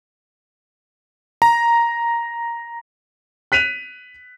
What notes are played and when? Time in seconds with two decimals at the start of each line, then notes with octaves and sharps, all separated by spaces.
1.42 A#5
3.52 F#6 B6 D#7 F7